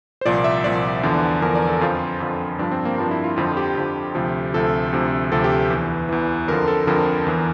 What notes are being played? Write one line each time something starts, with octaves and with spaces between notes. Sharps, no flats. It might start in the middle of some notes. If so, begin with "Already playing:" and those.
C5
C2 A#2 F3 D5
E5
C2 A#2 F3 D5
E2 D3 F3
E2 D3 F3 A#4
D5
A4
F2 D3 F3 F4
F2 D3 F3
G2 F3 D4
C4
A#3
G2 F3 D4
E4
F4
F2 D3 F3 F4
G4
F2 D3 F3
D2 C3 F3
D2 C3 F3 A4
D2 C3 F3
D2 C3 F3 A4
G4
E2 E3
E2 E3
F2 D3 F3 A#4
A4
F2 D3 F3 A#4
E2 E3